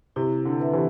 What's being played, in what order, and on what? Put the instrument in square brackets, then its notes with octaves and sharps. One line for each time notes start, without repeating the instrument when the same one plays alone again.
[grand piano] C3 [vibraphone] E4
[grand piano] D3
[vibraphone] B4 E5
[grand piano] C3 E3